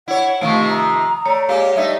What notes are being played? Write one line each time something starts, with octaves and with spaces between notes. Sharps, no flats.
E4 C#5 F#5
C3 D#3 F3 A3 F5 C#6
A#5 D#6
A3 C#5 D5
G#3 A#3 G4 F5
G3 A3 D#4 E5